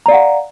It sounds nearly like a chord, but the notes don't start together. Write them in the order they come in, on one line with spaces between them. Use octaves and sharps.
A#5 D5 F5 F#5